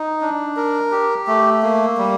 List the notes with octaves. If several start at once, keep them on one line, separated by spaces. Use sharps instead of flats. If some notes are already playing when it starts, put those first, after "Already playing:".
Already playing: D#4
D4
A#4
G4
A3
A#3
G3